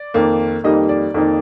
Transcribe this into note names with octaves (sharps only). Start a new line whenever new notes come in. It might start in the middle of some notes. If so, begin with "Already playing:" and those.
Already playing: D5
F2 D#3 A#3
F2 D#3 G3 A#3 D#4 D#5
D5
F2 D#3 A#3 D#4